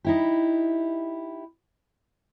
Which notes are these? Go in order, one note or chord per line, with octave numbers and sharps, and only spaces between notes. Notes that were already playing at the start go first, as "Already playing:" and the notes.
D#4 E4 G4